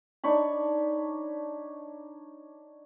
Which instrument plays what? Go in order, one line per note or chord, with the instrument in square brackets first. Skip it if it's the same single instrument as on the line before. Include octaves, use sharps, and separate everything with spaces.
[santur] D4 D#4 C#5 B5